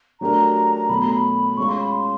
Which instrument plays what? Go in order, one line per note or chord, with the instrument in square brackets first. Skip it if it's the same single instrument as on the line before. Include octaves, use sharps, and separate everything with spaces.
[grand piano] F#3 A3 D4 G4 A#4 [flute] A#5
[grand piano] B2 F#3 A3 [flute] B5
[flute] A#5
B5
[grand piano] G#3 C#4 F4 [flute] C#6
[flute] C6
B5
C6